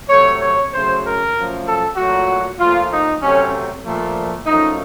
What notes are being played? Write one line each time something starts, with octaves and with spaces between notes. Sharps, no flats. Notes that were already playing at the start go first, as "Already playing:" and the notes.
C3 F#3 A3 C#5
C#5
F#2 C#3 F#3 A3 C5
A#4
F#2 F3 A3
A4
A#2 F#3 A3 F#4
A#2 F3 A3 F4
D#4
C3 F#3 A3 C#4
A#2 F3 A3
F#2 F3 A3 D#4